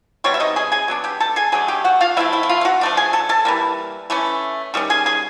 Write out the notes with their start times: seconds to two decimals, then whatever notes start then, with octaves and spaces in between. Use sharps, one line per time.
0.24 B2 G3 C4 C#5
0.34 E5
0.40 D#4 D#5
0.56 G#4 G#5
0.72 G#4 G#5
0.88 F#3 B3 D4
1.04 G4 G5
1.20 A4 A5
1.36 G#4 G#5
1.52 F#3 A3 D4 G#4 G#5
1.68 G4 G5
1.84 F#4 F#5
2.01 F4 F5
2.17 F3 A3 C4 E4 E5
2.33 E4 E5
2.43 E5
2.49 F4 F5
2.61 F5
2.65 F#4 F#5
2.81 F3 A3 D4
2.97 G#4 G#5
3.13 A4 A5
3.29 A4 A5
3.45 E3 G3 A#3
4.10 E3 A3 C#4
4.74 D#3 G3 C#4
4.90 G#4 G#5
5.06 G#4 G#5